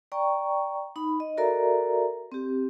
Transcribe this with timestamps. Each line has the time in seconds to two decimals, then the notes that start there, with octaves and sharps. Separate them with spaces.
0.12 D5 G5 A#5 C#6
0.96 D#4 B5
1.20 D#5
1.37 F#4 A4 A#4 D5 E5 A#5
2.32 C4 G4